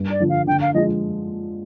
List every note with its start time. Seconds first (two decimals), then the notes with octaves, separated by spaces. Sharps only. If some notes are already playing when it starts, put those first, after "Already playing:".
Already playing: G2
0.11 D5
0.20 D3 F3
0.29 F5
0.47 D3 G5
0.61 F5
0.74 F3 G#3 D#5